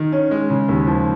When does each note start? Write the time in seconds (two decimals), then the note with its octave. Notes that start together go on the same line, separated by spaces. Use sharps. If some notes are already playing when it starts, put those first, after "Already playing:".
Already playing: D#3
0.12 C#4
0.31 G#3
0.50 C#3
0.68 D#2
0.87 F3